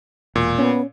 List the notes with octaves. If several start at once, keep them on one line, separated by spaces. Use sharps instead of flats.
E1 A#2
B3 C#4